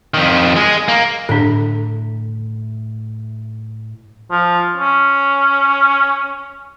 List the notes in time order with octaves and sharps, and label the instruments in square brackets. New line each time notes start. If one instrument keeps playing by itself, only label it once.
[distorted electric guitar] F2 D#3
G#3 G#4
A#3
[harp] A2 [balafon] D3 D4
[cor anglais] F3
C#4